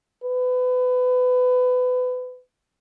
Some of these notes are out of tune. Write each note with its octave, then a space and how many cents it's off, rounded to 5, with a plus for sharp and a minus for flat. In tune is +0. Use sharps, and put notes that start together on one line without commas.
B4 +25